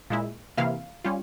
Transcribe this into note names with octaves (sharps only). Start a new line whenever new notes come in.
A#2 G#3 E4
C3 E3 A#3 E4 F5
G3 C#4 F4